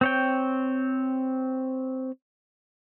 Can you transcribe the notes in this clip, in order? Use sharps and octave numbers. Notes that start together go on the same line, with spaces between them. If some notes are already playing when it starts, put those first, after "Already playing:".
C4 C#5 G5